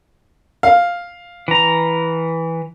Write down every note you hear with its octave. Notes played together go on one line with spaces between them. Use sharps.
F5
E3 A#5